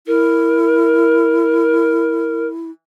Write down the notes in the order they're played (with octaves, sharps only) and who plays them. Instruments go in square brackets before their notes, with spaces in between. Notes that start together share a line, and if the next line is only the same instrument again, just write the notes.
[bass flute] E4 [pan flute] A#4